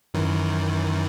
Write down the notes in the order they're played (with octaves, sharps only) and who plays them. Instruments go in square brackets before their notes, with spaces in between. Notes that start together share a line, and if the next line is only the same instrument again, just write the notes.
[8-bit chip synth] F#2 D#3 E3